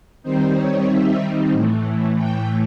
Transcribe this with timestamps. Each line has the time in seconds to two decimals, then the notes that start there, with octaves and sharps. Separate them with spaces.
0.22 D#3 G3 C4 D#4 C5
0.55 C#5
0.87 E5
1.52 A2 E3 A3
2.16 G5